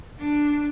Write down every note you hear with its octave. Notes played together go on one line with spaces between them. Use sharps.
D4